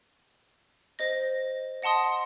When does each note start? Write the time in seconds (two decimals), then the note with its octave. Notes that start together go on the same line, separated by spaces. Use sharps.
0.99 C5 D#5 A#6
1.82 D#5 F#5 A5 C6 D#6